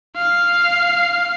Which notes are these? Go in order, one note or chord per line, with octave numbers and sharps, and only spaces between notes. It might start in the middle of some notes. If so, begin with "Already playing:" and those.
F5